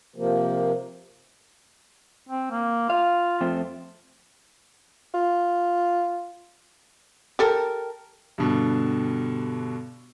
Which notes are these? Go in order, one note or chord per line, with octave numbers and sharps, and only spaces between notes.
C3 F3 A#3
C4
A#3
F4 F5
F2 A3 C4
F4
G4 A4 A#4
G2 B2 D3